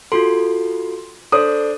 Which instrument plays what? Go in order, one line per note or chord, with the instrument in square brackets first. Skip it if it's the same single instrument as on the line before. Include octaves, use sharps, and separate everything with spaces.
[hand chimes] F4 F#4 A4 [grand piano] C6
[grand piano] D4 C5 D#6 [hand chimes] A4